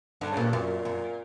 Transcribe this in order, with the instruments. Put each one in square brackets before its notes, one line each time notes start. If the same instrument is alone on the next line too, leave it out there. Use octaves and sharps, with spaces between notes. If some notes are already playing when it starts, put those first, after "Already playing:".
[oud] G2 [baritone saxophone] D3
[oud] A#2 [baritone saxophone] C#3
[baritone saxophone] G2
[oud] F#2 [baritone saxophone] A#2
[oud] F#2